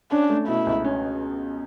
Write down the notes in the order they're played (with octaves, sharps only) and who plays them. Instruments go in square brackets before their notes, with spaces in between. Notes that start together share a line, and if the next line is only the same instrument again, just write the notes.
[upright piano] C#4 [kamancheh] D4
[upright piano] A3
[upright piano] B2 [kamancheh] E4
[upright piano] C#2
C#4